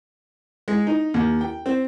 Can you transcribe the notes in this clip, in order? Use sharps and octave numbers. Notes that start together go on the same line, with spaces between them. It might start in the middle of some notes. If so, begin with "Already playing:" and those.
G#3
D#4
D#2
G5
C4